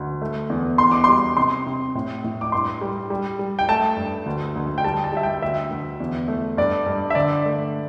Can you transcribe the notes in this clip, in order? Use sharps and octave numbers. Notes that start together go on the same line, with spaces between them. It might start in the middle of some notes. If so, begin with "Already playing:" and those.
Already playing: D2
A3
E2
E2 C6
D6
G3 C6
C3 C6
C3
A2
A2
D6
G2 C6
G3
G3
G3
G5
A3 A5
G2
D2
D2
G5
G3 A5
A5
G3 E5
G5
D2 E5
D2
E2
A3
G2 D5
G2
E5
D3 D5
A3